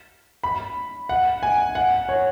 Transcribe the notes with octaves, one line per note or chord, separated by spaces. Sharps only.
B5
F#5
G#5
F#5
C#5